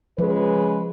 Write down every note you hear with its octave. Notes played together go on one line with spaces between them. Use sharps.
C#3 F3 G#3 B4